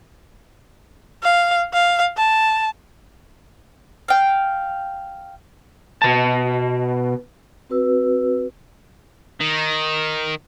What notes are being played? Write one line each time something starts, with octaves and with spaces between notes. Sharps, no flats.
F5
F5
A5
F5 G5
B2 A5
C4 F#4 B4 E6
D#3